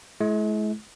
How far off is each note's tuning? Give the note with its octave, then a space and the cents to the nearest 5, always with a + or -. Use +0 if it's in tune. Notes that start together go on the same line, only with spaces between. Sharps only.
G#3 +45 E4 +0